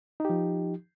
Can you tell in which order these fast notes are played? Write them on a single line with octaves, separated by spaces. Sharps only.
D#4 G4 F3